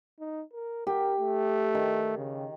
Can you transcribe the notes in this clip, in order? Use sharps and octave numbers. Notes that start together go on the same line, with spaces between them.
D#4
A#4
G4 A#4
A3
D#3
C#3